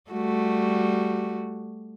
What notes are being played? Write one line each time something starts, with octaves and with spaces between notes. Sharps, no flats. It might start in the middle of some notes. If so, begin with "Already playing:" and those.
G3 A3 F#4